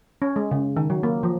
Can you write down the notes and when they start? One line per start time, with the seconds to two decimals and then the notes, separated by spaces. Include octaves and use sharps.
0.22 C#4
0.36 G#3
0.51 C#3
0.77 D#3
0.90 F#3
1.03 A#3
1.23 F3